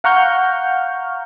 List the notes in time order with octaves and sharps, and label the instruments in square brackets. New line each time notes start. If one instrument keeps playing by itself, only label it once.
[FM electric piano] F5 F#5 A#5 C#6 F6 G6